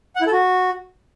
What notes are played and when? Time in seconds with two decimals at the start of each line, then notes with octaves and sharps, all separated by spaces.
0.16 F#5
0.21 E4
0.27 A4
0.32 F#4